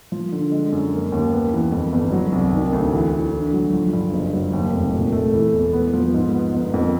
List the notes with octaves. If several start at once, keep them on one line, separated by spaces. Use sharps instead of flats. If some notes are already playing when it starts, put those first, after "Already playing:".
F3
D3
G#3
F#2
A#3
D#2
B3
E3
F2
G1
F#3
C2
D#3
D2
E3
E3
D3
F#3
F3
G2
F#1
F#3
D#2
F1
A#2
A3
E3
E1
B3
F3
G#2
B3
G1
F2